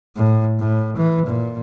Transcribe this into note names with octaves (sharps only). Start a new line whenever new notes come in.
A2
A2
E3
A#2